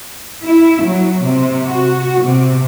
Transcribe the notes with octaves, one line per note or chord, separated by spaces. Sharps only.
E4
F#3
C3
F#4
C3